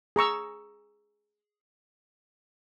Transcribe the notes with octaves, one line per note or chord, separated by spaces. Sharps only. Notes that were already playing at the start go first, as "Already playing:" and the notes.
G#4 A#5 C#6 E6